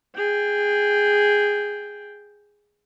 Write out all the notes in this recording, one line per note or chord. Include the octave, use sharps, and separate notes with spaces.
G#4 G5